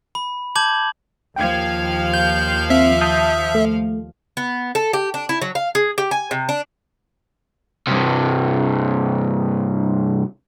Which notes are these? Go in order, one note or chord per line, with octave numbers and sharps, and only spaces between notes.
B5
A5 D6 G6 G#6 F#7
D#2 F3 F5 G5 G#6
G6
C4 E5
A5 D#6 G6
A3
B3
A4
G4
D4
E4
F#3
F5
G#4
G4
G#5
C3
D4
G2 C3